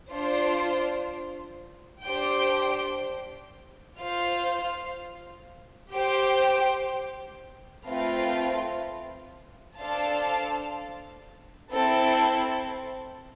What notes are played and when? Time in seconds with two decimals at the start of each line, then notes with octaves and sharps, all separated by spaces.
0.11 D4 F4 C5
2.05 D4 G4 C5 G5
3.99 F4 C5 F5
5.92 G4 C5 G5
7.86 A3 C4 F4 B4 F5
9.79 D4 A4 C5 F5 A5
11.73 C4 E4 A4